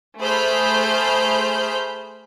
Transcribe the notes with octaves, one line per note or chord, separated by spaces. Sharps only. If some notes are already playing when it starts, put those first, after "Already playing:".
A3 G#4 C5 B5 F6 G6